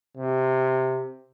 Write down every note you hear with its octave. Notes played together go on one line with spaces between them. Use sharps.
C3